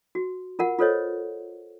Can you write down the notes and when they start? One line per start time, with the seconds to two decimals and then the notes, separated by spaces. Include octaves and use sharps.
0.15 F#4
0.59 F4 A#4 F#5
0.79 F4 A4 C5 C#5 D#5